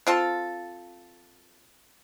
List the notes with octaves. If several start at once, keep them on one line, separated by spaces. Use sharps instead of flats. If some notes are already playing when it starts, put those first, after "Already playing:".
C4 F4 A4